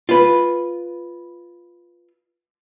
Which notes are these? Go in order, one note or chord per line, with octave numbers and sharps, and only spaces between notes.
F4 B4